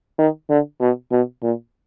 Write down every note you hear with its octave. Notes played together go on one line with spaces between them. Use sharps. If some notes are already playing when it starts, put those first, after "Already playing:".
D#3
D3
B2
B2
A#2